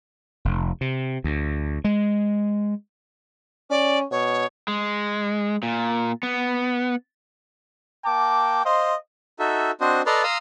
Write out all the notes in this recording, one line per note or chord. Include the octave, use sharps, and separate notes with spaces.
F1
C3
D2
G#3
C#4 D5
B2 C#5
G#3
A#2
B3
A#3 G5 A5 D6
C5 D#5 F5 C6
D#4 F#4 A4 E5
C4 D4 F#4 C5 D#5
A4 B4 D5 D#5 A#5 C6
F5 A#5 C6 D#6 E6